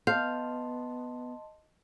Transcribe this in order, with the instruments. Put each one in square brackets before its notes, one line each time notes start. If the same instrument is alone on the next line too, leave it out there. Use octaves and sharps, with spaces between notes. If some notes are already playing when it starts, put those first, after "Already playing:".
[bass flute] B3 [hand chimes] D#5 A5 C6 [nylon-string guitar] F5 [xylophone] F6 G6 C7